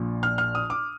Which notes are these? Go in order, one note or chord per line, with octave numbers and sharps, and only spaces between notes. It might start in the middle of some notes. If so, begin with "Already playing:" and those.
Already playing: A#1 A#2 F3
F6
F6
D#6
D6